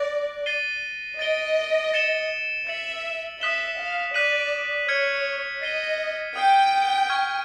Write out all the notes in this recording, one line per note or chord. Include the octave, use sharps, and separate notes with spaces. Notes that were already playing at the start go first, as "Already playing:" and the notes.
Already playing: D5 F#6 A#6 D7 F#7
A6 C7 D#7 G7
D#5 A6 D7 G7
A6 C#7 E7 G7
E5 A6 C#7 F#7
E5 D#6 F#6 B6 E7 G7
F5
D5 F#6 B6 D#7 F#7
C#5 F6 G#6 C#7
D#5 A6 C7 D#7 G7
G5 D#6 G6 C7
C#6 F6 G#6